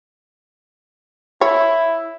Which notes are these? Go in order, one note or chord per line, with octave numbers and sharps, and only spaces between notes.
E4 C#5